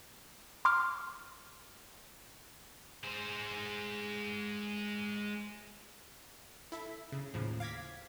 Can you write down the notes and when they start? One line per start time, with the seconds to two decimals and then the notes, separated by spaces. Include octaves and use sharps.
0.65 C6 D6 F6
3.04 G#3 C5
6.72 E4 A4 E5
7.12 C#3
7.34 D#2 A2 C#3 F3
7.60 F5 D6 G#6 A#6 B6